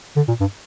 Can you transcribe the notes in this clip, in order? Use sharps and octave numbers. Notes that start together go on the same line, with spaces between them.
D3
A#2
G2